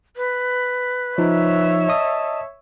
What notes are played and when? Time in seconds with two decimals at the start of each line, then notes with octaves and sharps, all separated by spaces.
0.17 B4
1.18 F3 D#4 C#5 E5
1.89 D#5 A5 D#6